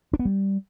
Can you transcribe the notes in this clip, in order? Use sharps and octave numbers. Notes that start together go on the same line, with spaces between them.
D4
B3
G3